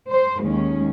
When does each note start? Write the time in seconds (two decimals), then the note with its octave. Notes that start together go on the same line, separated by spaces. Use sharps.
0.10 C5
0.40 D#2 D#3 G#3 C#4